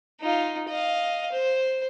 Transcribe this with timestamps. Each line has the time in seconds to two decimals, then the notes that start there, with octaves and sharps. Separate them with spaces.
0.21 D#4 F4
0.68 D#5 F5
1.31 C5